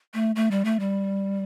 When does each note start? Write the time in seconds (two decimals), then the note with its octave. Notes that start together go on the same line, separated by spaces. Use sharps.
0.14 A3
0.36 A3
0.51 G3
0.65 A3
0.80 G3